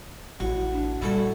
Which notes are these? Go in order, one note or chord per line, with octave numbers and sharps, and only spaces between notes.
A1 E4 F#4
D4
A#2 G3 E4 F#4 A4